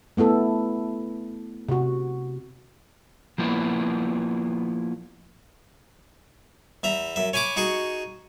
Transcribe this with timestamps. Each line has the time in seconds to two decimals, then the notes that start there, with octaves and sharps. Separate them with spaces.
0.17 A3 B3 E4 A4
1.69 C3 F#4
3.38 F3 A#3 B3 E4
6.83 E2 E5 A#5
7.16 F#2 E5
7.33 C#5 G#5 B5 C#6 D6
7.56 D#4 F#4 G#4 C#6